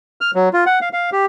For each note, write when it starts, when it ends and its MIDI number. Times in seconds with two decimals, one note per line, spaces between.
0.21 0.31 89
0.35 0.49 54
0.53 0.64 65
0.66 0.79 78
0.81 0.89 77
0.93 1.10 77
1.12 1.26 67